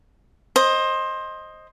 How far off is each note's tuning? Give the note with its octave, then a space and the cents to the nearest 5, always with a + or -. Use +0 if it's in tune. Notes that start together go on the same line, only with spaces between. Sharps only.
C5 +20 D#5 +0